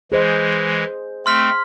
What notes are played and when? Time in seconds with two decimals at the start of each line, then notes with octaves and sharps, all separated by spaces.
0.12 E3 G#3 G#4 C5 D#5
1.26 A3 C4 C6 F6 B6